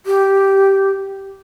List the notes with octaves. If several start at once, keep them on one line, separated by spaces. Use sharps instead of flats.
G4